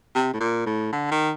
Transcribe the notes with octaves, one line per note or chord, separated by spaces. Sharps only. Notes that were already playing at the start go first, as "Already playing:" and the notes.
C3
A2
A#2
A2
D3
D#3